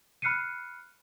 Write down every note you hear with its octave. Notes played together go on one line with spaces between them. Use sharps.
B5 F6 F#6 C7 C#7 D#7